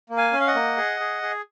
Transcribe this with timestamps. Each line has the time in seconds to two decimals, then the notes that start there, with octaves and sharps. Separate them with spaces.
0.10 A#3
0.17 F5 G#5
0.32 C#4
0.40 F5
0.47 D#5 F#5
0.55 A#3
0.77 G#4
1.00 G#4
1.22 G#4